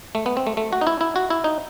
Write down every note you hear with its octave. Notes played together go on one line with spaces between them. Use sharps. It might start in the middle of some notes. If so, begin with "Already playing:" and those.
A3
B3
C4
A3
A3
F#4
D#4
E4
E4
F#4
E4
D#4